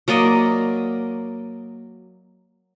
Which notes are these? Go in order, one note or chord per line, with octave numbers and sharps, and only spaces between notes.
F#3 A#3 D5 D#5